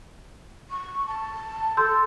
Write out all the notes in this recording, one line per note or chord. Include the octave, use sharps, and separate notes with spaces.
C#6
A5
A4 C6 E6 G6